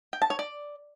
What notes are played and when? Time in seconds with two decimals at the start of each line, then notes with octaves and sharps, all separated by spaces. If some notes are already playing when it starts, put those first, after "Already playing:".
0.13 G5
0.22 A5
0.30 C#5
0.39 D5